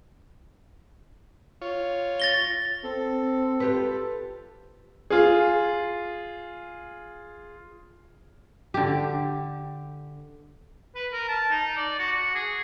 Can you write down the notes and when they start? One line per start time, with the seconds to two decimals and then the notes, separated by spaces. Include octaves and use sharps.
1.62 F4 C#5
2.20 A6 A#6 G7
2.83 C4 A4
3.60 F4 G4 B4
5.10 F4 G#4
8.74 D3 G4
10.95 B4
11.13 A#4
11.29 A5
11.51 D#4
11.77 D5
11.99 F#4
12.12 F#4
12.35 G#4